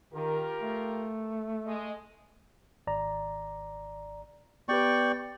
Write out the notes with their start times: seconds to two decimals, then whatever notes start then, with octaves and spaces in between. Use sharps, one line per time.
0.13 D#3 F4 G4 A#4
0.62 A3
1.66 G#3 D#5
2.87 G#1 D5 A#5
4.69 B3 G4 B4 D5 G5 C#6